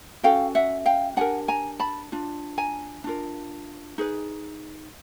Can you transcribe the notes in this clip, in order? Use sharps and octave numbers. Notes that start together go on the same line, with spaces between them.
C#4 F#4 A4 F5 G5
E5 F#5
F5 G5
D4 G4 A#4 F#5 G#5
G#5 A#5
A5 B5
D4 F4
G#5 A#5
D4 F4 A#4
D#4 G#4 B4